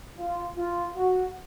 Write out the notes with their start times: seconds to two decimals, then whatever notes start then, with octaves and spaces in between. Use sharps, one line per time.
0.17 F4
0.56 F4
0.97 F#4